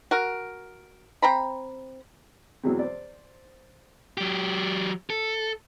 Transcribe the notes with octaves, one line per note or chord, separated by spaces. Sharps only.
F#4 A#4
C4 A#5 B5
E2 B2 E3 F#3 G#3 C4
C5 D5
F#3 G4
A4